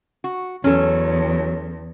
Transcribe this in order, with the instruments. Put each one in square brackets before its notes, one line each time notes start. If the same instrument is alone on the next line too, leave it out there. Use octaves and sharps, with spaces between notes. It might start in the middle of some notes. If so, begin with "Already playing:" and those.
[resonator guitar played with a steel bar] F#4
[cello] E2 [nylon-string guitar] F#3 [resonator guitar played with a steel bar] C#4 A4